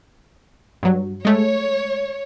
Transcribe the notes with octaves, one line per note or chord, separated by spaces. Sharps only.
G2 F#3
G#3 A3 C#5